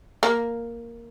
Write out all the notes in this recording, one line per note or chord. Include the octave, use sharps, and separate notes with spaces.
A#3